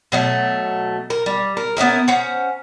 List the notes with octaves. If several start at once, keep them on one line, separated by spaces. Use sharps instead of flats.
B2 F#3 A3
A#4
G3
A#4
B3 C#4 E4 A#4
C#4 C5 F#5 A#5